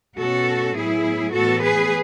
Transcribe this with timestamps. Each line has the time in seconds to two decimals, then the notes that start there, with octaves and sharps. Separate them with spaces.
0.18 B2 A3 C#4 F#4 A4
0.76 A2 F#3 B3 E4 G#4
1.34 A2 E3 B3 F#4 A4
1.63 G#4 B4